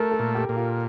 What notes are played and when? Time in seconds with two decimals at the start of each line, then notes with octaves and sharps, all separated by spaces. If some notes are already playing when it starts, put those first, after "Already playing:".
Already playing: A3 A#4
0.11 A4
0.19 A#2
0.35 G4
0.49 A#2
0.57 F4